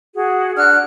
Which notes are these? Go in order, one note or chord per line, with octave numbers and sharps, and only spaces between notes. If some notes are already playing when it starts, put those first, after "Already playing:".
F#4 G#4
D4 F#4 F6 F#6